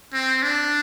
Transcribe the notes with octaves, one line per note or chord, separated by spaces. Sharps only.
C4
D4